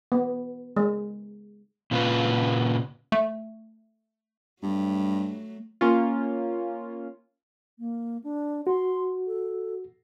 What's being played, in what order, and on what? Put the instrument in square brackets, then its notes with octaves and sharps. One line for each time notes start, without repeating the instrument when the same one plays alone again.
[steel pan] B3
G#3
[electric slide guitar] A#2 C#3 F4 B4
[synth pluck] A3
[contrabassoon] G2 [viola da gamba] F#3 A3
[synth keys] A#3 C#4 F4
[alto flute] A#3
D4
[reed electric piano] F#4 [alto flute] C6
[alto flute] A4